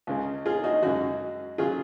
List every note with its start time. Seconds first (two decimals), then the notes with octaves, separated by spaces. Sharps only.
0.07 C#2 C#3 G#3
0.46 F4 G#4
0.64 D#4 F#4
0.83 F#2 C#3 G#3 D#4 F#4
1.58 C#3 F#3 F4 G#4